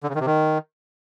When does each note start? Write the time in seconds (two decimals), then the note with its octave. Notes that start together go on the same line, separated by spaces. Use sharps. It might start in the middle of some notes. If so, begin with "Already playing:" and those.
0.03 D3
0.09 C#3
0.15 D#3
0.20 C3
0.26 D#3